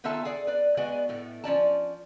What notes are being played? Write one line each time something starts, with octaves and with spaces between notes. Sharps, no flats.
D#3 B3 F4 A4 E5 A5
G#4 A4 D5
B4 D5
G#3 B3 F#4 D5 G#5
A2 A3
F3 C#4 D5 A5